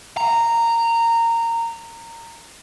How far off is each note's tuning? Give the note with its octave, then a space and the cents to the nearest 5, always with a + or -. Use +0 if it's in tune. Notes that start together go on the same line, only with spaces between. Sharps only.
A#5 -15